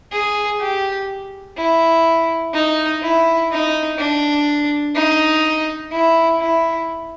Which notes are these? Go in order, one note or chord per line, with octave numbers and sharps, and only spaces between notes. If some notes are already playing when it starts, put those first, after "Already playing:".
G#4
G4
E4
D#4
E4
D#4
D4
D#4
E4
E4